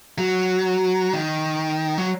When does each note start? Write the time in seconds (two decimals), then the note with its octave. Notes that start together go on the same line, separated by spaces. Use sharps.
0.18 F#3
1.13 D#3
1.98 F#3